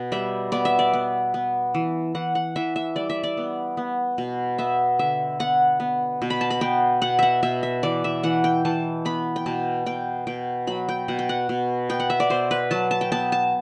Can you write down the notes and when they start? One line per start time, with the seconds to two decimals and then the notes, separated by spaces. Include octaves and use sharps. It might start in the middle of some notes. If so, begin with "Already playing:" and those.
Already playing: B2
0.12 G3 E5
0.52 B3 D5
0.65 E5
0.79 D5
0.93 B3
1.34 B3
1.74 E3
2.15 E3 F#5
2.35 F#5
2.56 E3 E5
2.76 E5
2.96 G3 D5
3.10 E5
3.23 D5
3.37 B3
3.77 B3
4.18 B2
4.58 B3 E5
4.99 D3 E5
5.40 B3 F#5
5.80 B3
6.22 B2
6.30 B5
6.41 A5
6.50 B5
6.61 B3 G5
7.02 B2 F#5
7.19 E5 F#5
7.43 B2 E5
7.63 E5
7.83 E3 D5
8.04 E5
8.23 E3 F#5
8.44 G5
8.65 E3 A5
9.05 B3 B5
9.36 G5
9.46 B2 A5
9.86 B2 G5
10.27 B2 G5
10.67 F#3 B5
10.89 G5
11.08 B2 F#5
11.19 G5
11.29 F#5
11.49 B2
11.89 B3 G5
12.00 F#5
12.10 E5
12.20 D5
12.30 B2 C5
12.51 B4
12.71 F#3 A5
12.91 A5
13.01 G5
13.12 B3 A5
13.32 A5